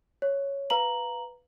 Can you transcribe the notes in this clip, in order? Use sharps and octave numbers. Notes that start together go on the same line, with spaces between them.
C#5
B4 F5 A#5 F#7